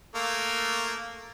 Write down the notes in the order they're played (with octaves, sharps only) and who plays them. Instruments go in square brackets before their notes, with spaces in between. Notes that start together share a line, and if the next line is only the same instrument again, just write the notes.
[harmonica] A3 A#3 F5